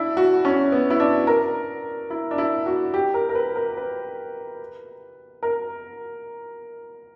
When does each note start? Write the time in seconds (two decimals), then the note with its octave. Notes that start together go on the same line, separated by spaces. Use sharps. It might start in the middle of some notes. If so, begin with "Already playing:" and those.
Already playing: D4 E4
0.17 F#4
0.45 C#4
0.72 B3
0.90 E4
1.00 D4
1.27 A#4
2.10 E4
2.31 D4
2.38 E4
2.66 F#4
2.94 G4
3.14 A#4
3.29 A#4
3.35 B4
3.56 A#4
3.77 B4
5.43 A#4